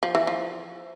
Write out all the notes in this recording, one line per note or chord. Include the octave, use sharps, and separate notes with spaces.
F3
E3
F3